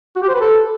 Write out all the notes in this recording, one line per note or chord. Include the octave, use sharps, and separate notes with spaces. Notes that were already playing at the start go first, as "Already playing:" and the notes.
F#4
G4
C5
B4
A4